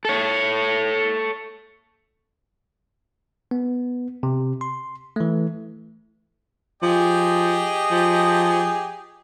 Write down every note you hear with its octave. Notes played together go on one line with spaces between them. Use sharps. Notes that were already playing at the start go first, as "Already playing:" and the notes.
A4 C#5
B3
C3
C6
E3 A3
F3 G4 G#4 D#5
F3